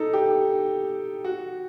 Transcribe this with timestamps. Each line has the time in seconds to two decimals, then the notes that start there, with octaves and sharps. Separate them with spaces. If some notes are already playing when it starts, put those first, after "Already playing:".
Already playing: D#4 A4
0.13 G4
1.24 F#4